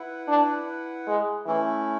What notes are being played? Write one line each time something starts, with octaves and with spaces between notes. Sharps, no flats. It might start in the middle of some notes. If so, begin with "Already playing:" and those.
Already playing: E4 B4 F#5
D4
G#3
E3 A3 C#4 E4